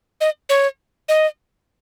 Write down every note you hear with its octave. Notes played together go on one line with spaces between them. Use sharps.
D#5
C#5
D#5